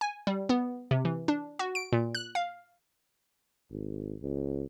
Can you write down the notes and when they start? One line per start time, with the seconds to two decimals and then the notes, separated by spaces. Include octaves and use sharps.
0.01 G#5
0.27 G3
0.49 B3
0.91 C3
1.05 E3
1.28 D4
1.59 F#4
1.75 D7
1.92 A#2
2.15 F#6
2.35 F5
3.71 G#1
4.22 C#2